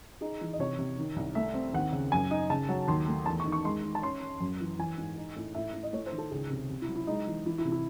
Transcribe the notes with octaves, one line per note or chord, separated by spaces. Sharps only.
D#4 G#4
E3
D#5
C3 C#5
C3
D#3
C2
A3 E5
C4
D#2 F#5
C#3
F#2 G#5
D#4
C#3 A5
F#3
D#2 C6
A3
E2 A5
C#6
D#3
C#6
G#3 C6
D#3
A5
C#4 C6
C#4
F#2
E3
E3 G#5
G#2
D#4
A2
A2 E5
A2
D#5
A3 C#5
C5
D#3
A4
C#2 G#4
C3
C3
E4
F#3
E4
G#3 D#4
E3
E3 E4
E4
C3
E4